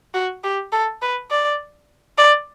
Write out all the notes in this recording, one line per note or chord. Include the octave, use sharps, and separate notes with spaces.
F#4
G4
A4
B4
D5
D5